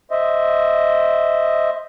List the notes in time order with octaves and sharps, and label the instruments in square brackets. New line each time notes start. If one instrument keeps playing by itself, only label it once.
[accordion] C5 D#5 E5